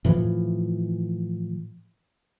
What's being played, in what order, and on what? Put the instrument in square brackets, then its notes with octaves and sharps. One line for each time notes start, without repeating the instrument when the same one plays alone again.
[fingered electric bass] A2 E3 F3